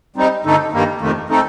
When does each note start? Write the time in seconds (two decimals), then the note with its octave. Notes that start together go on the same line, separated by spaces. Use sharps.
0.16 G3 C4 D#4
0.45 G2 D3 A3 D#4 A4
0.73 G2 D#3 G3 A#3
1.01 F2 C3 D#3 A3
1.29 A3 C4 D#4 A4